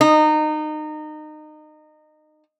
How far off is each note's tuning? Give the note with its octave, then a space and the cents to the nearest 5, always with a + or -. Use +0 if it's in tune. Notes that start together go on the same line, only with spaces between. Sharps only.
D#4 -25